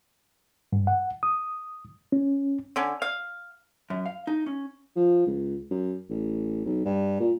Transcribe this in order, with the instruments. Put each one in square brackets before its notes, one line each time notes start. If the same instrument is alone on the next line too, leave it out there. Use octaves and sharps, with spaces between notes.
[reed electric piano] G2
F#5
D#6
C#4
[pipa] D3 C#4
F5
[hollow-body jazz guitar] F#2
F5
D#4
C#4
[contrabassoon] F3
C#2
F#2
A1
B1
G2
A#2